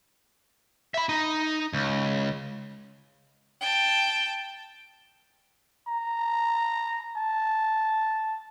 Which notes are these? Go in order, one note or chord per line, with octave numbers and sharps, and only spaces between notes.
E5 B5
D#4
C#2
G5 A5
A#5
A5